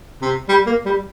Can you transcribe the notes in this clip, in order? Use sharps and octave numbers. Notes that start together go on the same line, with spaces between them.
C3
G3
A#3
G3